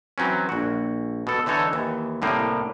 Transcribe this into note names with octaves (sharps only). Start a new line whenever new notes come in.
E3 F#3 C4 C#4
A#1 F#4
B2 A4
D3 E3 D#4 A4 C#5
D#2 E3
C2 A2 A#3 G4